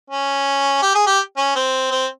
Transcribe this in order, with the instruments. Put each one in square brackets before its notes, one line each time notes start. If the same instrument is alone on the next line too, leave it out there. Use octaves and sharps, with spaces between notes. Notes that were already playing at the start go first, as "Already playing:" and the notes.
[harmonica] C#4
G4
G#4
G4
C#4
C4
C4